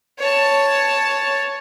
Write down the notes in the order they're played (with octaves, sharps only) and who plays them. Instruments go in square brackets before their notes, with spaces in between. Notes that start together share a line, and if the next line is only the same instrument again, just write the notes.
[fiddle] C#5 A5